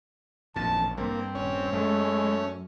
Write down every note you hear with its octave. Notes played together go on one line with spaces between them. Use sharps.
A1 F2 A#2 D3 A5
G2 G3 A#3 C4
D#1 C#4
F#2 G#3 A3